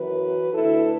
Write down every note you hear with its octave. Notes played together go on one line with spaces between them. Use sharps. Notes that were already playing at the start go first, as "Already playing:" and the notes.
Already playing: F#2 E3 F#4 B4
D2 D3 E4 A4